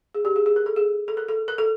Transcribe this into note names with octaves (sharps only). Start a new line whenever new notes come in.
G#4
G4
G#4
G#4
A#4
A4
G#4
A4
A#4
A4
A#4
A4